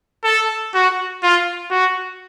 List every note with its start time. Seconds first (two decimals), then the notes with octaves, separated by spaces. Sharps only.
0.24 A4
0.74 F#4
1.23 F4
1.70 F#4